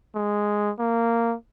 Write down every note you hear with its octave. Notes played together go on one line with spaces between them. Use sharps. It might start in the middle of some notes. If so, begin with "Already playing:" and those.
G#3
A#3